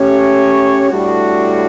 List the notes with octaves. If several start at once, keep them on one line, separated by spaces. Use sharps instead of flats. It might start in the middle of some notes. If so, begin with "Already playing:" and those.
Already playing: A3 C#4 G4 C#5
A2 G3 D4 F#4